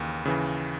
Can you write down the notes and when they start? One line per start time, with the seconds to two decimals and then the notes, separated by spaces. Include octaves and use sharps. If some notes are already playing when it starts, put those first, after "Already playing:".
Already playing: D#2 C#3 E3
0.25 C#3 E3